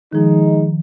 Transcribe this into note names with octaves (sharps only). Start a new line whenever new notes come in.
D#3 F3 G#3 D#4